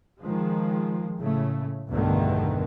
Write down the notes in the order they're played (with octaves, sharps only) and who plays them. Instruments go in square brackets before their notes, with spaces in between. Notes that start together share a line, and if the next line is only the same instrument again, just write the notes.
[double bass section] D#3 F3 G#3
A2 C#3 A3
B1 E2 G2 D3 D#3 A3